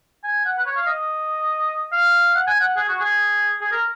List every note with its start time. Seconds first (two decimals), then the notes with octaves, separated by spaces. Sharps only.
0.24 G#5
0.45 F#5
0.58 B4
0.66 C#5
0.77 F5
0.87 D#5
1.92 F5
2.35 F#5
2.47 G#5
2.60 F#5
2.77 G#4
2.88 F#4
3.00 G#4
3.61 G#4
3.72 A#4